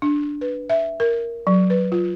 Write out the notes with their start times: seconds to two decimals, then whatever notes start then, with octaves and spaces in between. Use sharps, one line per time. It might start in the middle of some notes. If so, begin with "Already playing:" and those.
0.02 D4
0.41 B4
0.70 E5
1.00 A#4
1.47 F#3
1.70 B4
1.92 F4